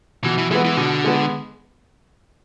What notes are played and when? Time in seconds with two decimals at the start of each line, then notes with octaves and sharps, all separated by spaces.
0.24 B2 E3
0.38 E3
0.51 E3 G#3 B3
0.65 E3
0.77 B2 D3
1.04 G#3 B3